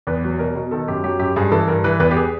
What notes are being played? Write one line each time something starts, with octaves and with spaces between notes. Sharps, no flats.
E2 B4
F#3
B2 A#4
B2
D#3 A4
F#2 G4
F#3 G4
F#2 G4
G2 G#4
E3 A4
G2 A#4
E3 B4
E2 B4
G4
G#4